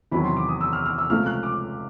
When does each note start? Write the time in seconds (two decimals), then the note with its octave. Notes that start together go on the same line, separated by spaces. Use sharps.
0.12 E2 C3 D#3 F#3 B5
0.24 C6
0.37 D6
0.49 D#6
0.61 E6
0.73 F6
0.86 F6
0.98 E6
1.10 C#2 C3 F3 A3 F6
1.26 F#6
1.43 D6